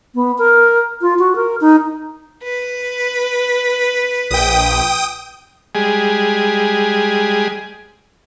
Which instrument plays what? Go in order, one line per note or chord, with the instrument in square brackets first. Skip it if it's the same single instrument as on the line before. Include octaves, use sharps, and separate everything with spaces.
[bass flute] B3
A#4
F4
F#4
A#4
D#4
[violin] B4
[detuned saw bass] A#1 [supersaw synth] G5 D#6
[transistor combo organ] G3 G#3 G#4